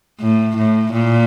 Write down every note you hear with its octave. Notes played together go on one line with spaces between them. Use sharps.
A2
A2
A#2